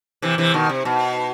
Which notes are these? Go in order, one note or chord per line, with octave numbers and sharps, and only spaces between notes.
C3 E3
C3 E3
B2 D#3
C3
B2